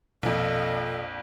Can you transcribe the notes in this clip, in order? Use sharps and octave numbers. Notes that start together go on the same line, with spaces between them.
A#1 F2 B2 A#3 A4 D#5 F5